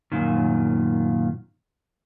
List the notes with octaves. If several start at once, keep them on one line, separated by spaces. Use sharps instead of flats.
F#2 A#2 D#3